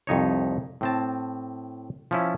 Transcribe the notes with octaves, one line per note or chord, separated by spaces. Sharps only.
C2 F2 D#4 C#5
A2 C4 A5
F3 C#4 E4